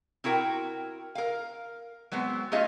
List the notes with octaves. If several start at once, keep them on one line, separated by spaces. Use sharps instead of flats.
C4 E4 F#4 A#4 G5
A#4 F5
F#3 G#3 B3 C4
A3 C#4 F4 G#4 D#5 F5